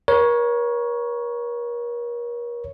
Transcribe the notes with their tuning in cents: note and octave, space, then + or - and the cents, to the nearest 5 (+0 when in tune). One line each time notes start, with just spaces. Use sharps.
A#4 +40 C#5 +0